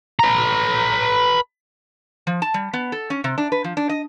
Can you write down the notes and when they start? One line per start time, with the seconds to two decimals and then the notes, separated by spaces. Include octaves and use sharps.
0.19 B4 A#5
2.27 F3
2.42 A5
2.54 G3
2.73 B3
2.92 A4
3.10 C#4
3.24 C3
3.38 D4
3.52 B4
3.64 F3
3.77 D4
3.89 D#5